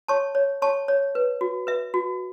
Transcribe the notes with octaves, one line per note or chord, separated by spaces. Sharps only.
C#5 A5 C#6
C#5
C#5 A5 C#6
C#5
B4
F#4
B4 E5
F#4